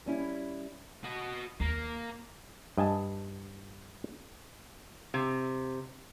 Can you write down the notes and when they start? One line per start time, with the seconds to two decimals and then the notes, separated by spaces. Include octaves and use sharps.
0.06 G3 C#4 E4
1.04 F#4 D#5
1.60 D#2 A#3
2.78 G2 D#5 G#5 A5
5.14 C3